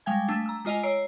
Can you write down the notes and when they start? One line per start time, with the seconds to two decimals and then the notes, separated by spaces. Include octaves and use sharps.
0.06 G3 G#3 F5 G5 G#5 G#6
0.28 A3 D4
0.46 A#5 E6
0.65 G#3 F4 D#5 G#5 F7
0.83 C#5 A#5 E6 C7 D7